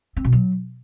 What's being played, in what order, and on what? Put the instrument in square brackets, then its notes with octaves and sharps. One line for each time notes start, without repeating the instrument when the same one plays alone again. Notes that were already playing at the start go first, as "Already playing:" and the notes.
[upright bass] C4
B2
F#3